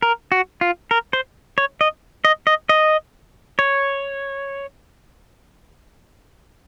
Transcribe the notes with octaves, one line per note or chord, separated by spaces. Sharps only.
A#4
F#4
F4
A#4
C5
C#5
D#5
D#5
D#5
D#5
C#5